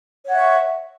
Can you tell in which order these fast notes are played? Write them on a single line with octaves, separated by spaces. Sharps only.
C#5 F#5 E5 C#6